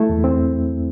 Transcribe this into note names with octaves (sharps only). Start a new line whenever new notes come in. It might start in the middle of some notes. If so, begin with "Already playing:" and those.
Already playing: A3 E4
E2
C4